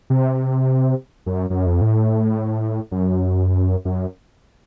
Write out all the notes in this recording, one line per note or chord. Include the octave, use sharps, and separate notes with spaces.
C3
F#2
F#2
F2
A2
F#2
F#2